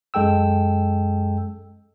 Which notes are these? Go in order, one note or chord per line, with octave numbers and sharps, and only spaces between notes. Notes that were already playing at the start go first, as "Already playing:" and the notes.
F#2 G#3 A4 G5 E6